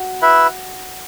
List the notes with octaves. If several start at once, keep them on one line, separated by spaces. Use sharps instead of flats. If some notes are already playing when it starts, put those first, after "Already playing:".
Already playing: F#4
E4 B4 E5